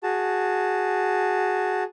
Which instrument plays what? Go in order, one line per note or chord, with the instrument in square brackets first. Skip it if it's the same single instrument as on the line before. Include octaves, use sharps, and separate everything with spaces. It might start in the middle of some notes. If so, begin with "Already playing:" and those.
[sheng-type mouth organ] F#4 G#4 A5